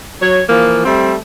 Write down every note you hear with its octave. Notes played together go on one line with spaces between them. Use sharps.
F#3 C#5
E3 F3 A#3
G3 A3 C4